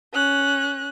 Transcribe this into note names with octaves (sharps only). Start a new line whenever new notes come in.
C#4 F#6